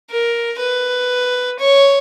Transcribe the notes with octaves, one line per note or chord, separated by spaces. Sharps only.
A#4
B4
C#5